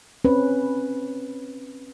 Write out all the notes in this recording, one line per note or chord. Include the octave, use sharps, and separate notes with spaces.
C4 C#4 B4